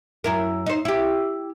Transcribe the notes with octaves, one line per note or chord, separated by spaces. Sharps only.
F#2 E4 A#4
D#4 C5
E4 G4